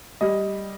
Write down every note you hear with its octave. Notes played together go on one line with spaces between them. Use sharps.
G3 D#5